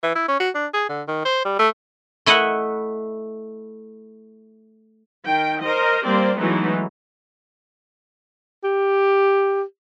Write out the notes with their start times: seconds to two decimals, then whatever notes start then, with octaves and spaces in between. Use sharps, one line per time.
0.03 E3
0.16 E4
0.28 C#4
0.40 F#4
0.55 D4
0.74 G#4
0.90 D3
1.08 D#3
1.25 C5
1.45 G3
1.59 A3
2.26 A3 E4 D#5 E5 F#5
5.27 D#3 G5
5.62 A#4 C5 D#5
6.05 G3 A#3 C4 C5 D5
6.39 E3 F#3 G#3 A3 B3 D#4
8.64 G4